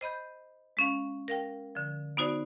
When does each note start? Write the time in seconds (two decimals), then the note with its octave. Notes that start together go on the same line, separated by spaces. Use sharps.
0.01 C5 D#5 B5 G6
0.77 G#3 C#4 F5
1.28 A#4 F5 G5
1.75 D3 F3
2.17 B3 D#4 F#4 C5 D5